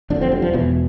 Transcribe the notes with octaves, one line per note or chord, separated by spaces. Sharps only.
F1 F2 D3 D4
C4
G3
F3
E1 E2 B2 E3